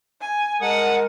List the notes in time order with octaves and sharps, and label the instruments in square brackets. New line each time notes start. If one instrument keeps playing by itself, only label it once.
[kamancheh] G#5
[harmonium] G#3 A#4 [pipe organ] F#5 [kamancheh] A5 D#6